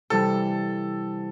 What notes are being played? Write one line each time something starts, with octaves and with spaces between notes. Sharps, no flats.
C3 E3 G3 A4